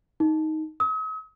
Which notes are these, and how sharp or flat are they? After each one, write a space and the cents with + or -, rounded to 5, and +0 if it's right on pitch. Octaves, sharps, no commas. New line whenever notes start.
D#4 +10
D#6 +45